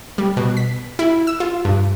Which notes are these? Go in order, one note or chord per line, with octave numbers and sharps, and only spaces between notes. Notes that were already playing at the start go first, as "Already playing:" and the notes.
G3
B2
B6
E4
E6
F4
G2